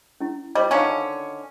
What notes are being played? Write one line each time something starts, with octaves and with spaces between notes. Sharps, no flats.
C#4 E4
G3 F4 C5 D#5
D3 D#3 C#4 C5 D5 F5